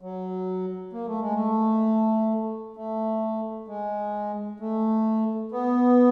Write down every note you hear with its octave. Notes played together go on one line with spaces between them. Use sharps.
F#3
A#3
A3
G#3
A3
A3
G#3
A3
B3